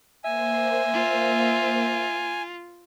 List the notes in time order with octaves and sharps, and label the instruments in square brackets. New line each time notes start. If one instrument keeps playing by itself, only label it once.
[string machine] A#3 C5 [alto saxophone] E5 [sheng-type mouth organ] G#5
[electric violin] F4